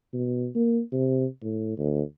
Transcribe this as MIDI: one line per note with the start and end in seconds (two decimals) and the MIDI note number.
0.14 0.48 47
0.55 0.80 58
0.92 1.26 48
1.42 1.73 45
1.78 2.02 38